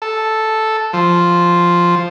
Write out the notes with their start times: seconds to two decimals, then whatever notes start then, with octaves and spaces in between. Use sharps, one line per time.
0.02 A4
0.93 F3